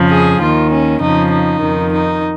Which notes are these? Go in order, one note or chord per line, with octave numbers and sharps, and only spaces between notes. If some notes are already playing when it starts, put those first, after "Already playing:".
Already playing: F2 C#3 F3
G#4
D#2 D#3 F4
C#4
F2 C#3 F3 D#4
D#4
F2 D#3
D#4